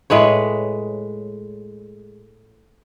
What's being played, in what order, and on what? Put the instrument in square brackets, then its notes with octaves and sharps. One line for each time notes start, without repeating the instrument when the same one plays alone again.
[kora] A2 G#3 B4 C#5